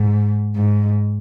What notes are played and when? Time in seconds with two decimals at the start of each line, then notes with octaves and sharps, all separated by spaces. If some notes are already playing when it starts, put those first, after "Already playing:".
Already playing: G#2
0.56 G#2